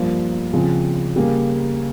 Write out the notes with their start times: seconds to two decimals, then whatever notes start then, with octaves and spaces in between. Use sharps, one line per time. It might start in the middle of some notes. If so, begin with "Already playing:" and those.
Already playing: G2 F3 A#3
0.53 C#3 F3 C4
1.16 C#3 G3 A#3